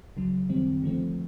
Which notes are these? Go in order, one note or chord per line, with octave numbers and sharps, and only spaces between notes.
C#2 C#3 F#3
F#2 D#3 G3 C4
D3 F3 A3 C4